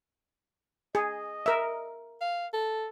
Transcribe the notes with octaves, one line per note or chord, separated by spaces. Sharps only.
G#4 D#5
A#4 E5
F5
A4